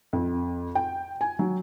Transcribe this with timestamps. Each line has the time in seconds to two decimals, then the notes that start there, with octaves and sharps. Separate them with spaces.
0.13 F2
0.75 G5
1.21 G#5
1.39 F#3